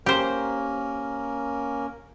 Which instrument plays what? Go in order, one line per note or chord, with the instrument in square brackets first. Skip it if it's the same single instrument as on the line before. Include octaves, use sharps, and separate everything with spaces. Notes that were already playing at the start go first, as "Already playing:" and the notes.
[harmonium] A#3 C#4 A#4 [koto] G4 C5